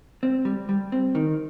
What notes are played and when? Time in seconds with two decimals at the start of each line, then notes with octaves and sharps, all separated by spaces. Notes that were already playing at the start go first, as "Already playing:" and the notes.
0.23 C4
0.45 G3
0.69 G3
0.92 C4
1.15 D#3